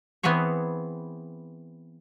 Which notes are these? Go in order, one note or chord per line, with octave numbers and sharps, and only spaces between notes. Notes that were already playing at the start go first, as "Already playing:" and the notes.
E3 B3 C4 G#4 C#5